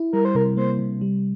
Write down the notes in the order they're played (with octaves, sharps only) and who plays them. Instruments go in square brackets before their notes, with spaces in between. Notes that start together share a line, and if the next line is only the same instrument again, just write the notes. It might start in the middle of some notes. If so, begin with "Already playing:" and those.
Already playing: [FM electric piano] E4
[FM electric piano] G3 [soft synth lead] A#4
[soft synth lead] C5
[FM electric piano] C3 [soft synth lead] A#4
[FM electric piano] A#3 [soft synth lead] C5
[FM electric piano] C3
G3